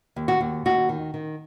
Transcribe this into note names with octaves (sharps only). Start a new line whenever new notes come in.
D#2
F#4
D#2
D#2 F#4
D#3
D#3